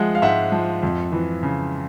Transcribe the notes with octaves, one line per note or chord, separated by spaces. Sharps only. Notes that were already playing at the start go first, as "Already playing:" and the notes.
Already playing: F3 G#3 E5 F#5
F5
G#2 E5 F#5
F3
F2
E3
C#3